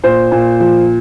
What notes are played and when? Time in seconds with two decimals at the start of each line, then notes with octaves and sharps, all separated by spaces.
0.03 A#2 C5
0.32 A#2
0.60 F3